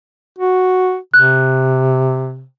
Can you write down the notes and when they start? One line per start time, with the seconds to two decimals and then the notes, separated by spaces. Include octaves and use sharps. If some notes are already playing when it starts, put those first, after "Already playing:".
0.39 F#4
1.14 C3 F#6